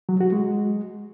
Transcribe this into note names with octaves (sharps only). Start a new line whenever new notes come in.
F#3
F#4
G#3